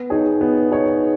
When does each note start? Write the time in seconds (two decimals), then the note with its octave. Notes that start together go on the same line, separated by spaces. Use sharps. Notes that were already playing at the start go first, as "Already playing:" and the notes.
Already playing: B3
0.10 D#4 G#4 C#5
0.41 B3
0.71 D#4 G#4 C#5